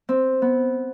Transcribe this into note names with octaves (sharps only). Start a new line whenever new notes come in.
C4
B3